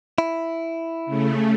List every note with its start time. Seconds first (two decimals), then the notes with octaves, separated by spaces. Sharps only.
0.18 E4
1.06 C#3 A3